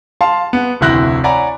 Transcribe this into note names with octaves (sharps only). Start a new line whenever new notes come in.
F5 A5 C6
B3
F1 D2 E4 F#6 A#6
C#5 D5 F#5 G#5 A#5 B5